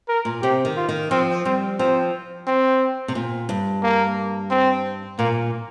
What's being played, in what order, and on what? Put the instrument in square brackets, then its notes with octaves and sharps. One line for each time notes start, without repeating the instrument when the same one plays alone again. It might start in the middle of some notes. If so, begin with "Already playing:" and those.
[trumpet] A#4
[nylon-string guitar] A#2
[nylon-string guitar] C3 [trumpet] G4
[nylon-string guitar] D#3
[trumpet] F4
[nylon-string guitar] D#3
[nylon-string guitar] F3 [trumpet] C4
[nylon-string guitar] G3 [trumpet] C4
[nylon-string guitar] F3 [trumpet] C4
[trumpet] C4
[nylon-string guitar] C3
A#2
G2
[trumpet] A#3
C4
[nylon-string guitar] A#2 [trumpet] A#3